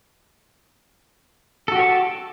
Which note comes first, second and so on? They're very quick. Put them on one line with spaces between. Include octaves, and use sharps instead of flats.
A4 F#4 G4 C#5 A5